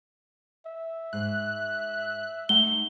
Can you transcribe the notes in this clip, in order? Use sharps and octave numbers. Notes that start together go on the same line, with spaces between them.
E5
G#2 F#6
A3 D#4 F#5 G7